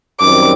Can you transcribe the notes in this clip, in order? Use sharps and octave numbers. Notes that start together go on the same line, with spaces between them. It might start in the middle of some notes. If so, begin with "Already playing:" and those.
F#2 D#3 G3 C4 D6